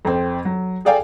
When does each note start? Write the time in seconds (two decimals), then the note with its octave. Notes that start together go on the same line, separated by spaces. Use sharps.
0.05 F2 C4
0.45 F#3
0.85 G#4 A4 D5 F5 G5 G#5